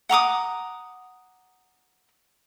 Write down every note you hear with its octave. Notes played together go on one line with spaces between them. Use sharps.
F#5 A#5 D6 D#6